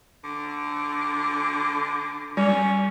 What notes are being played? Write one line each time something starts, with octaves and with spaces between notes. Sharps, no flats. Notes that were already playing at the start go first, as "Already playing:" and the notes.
D3
G3 C#4